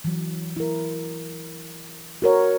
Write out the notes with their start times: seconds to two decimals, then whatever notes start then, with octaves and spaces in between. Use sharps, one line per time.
0.04 E3 F#3
0.56 E4 A#4
2.22 F#4 A#4 C#5